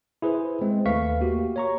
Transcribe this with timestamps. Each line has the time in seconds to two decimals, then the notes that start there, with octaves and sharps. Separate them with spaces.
0.22 E4 G#4 B4 C5
0.61 G#3 C4
0.86 D#2 A3 B4 F5 C#6 B6
1.21 A#3 F#4 G4
1.56 C#5 A#5 C#6